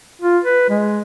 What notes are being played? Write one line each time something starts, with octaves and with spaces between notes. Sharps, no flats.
F4
B4
G#3